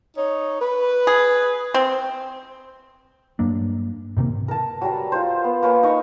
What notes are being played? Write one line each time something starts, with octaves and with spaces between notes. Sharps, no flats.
D#4 C#5
B4
G#4
C4
G2 F#3 A#3 D4
G#2 C3 D#3 A#3
A#4 A5
F#3 G3 A#4
F4 C5
B3
A#3 B4 C#5 G#5
D#4 A#4 C#6